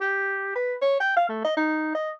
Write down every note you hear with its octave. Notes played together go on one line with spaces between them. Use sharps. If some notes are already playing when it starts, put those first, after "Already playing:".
G4
B4
C#5
G5
F5
A3
D#5
D#4
D#5